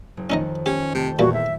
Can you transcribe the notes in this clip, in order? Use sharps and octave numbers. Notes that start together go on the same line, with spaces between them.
F#1
F2 D#3 C#4 D#4 D#5
C#4 G4
C3 A3 G5 A5
E2 A#2 E3 G3 F#4
E5